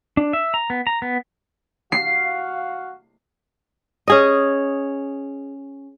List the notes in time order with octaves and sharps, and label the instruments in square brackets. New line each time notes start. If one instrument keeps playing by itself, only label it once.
[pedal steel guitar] D4
E5
A#5
B3
A#5
B3
[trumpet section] F#4 F5 [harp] C7
[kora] C#4 G#4 D#5